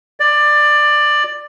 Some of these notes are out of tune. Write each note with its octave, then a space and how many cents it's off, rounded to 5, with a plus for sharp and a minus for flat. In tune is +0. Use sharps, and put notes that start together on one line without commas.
D5 +15